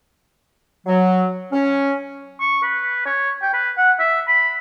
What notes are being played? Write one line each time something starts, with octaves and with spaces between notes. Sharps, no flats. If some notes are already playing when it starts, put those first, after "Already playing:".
F#3
C#4
C#6
B4
C#5
G5
B4
F#5
E5
B5